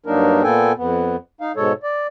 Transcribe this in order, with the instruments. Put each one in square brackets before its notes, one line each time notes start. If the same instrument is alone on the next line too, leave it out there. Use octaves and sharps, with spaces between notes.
[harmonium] G2 F#3 A#3 D4 D#4 A#4
A#2 A#3 B3 A4 G5 G#5
F2 B3
D#4 F5
G#2 B2 G#3 A4 C#5
D5